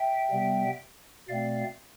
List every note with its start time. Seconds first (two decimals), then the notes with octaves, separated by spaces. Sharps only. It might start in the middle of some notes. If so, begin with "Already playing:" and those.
Already playing: E5 G5
0.30 C3 G3 B3
1.29 B2 A3 C4 D5 F5